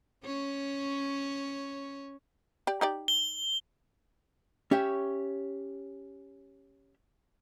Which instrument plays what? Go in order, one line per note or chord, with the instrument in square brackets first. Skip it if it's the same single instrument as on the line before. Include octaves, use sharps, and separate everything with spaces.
[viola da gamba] C#4 C#5
[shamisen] G4 D5
D#4 G4 D5
[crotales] G7
[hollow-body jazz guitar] C#4 G4 C#5 E5